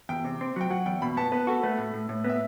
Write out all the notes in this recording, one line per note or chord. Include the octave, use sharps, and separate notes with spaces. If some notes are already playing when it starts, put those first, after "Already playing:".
E2 G5
C3
C4
F#3 G5
F#3 F#5
E2 G5
B2 B5
B3 A5
B3 B4
F#4 A4
A3 B4
A2
A2
A2
B3
E5